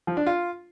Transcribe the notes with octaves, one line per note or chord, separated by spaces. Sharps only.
F3
D4
F4